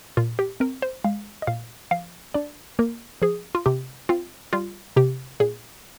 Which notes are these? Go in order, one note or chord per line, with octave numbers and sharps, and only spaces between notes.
A#2 F4
G4
C4 A#4
C5
G#3 F5
D#5
A#2 F5
F3 F5
D4 D5
A#3 A#4
F3 G#4
F4
C3 G4
C4 F4
G3 F4
C3 G4
A#2 G#4